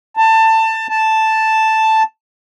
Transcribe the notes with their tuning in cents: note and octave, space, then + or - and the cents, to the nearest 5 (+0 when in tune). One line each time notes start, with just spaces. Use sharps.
A5 +20
A5 +0